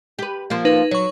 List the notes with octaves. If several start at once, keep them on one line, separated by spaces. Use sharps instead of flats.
G4 B4
F3 A#3
D#4 B4
F#3 C#5 C#6